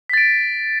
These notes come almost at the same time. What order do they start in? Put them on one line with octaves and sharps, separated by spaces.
B6 A6 D7